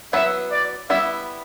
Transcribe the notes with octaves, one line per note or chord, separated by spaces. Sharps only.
F#3 B3 E4 B4 E5
D5
G3 B3 E4 E5